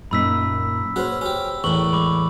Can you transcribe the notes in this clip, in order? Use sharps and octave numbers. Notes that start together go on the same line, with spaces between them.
F#2 A#2 D#4 B5 E6 B6
C#4 F#4 G#4 B4 C5 E6
C#4 G4
E2 A2 A#4 C#6 F#7
G#3 B5 C#6 D6